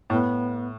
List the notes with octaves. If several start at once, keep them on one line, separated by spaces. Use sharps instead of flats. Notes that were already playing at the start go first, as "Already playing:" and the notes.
A2 B3